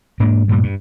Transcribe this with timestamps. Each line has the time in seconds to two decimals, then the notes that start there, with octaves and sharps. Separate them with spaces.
0.20 G#2 A#3 D4
0.48 D2 G2 A#2 G3
0.63 G2